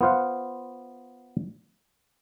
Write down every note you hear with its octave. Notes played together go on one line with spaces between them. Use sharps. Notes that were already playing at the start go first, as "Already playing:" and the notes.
B3 F4 C5 F5 F#5